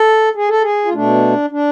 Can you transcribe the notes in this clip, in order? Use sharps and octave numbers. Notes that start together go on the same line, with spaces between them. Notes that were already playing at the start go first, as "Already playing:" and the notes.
Already playing: A4
G#4
A4
G#4
F4
B2 A3 D4
D4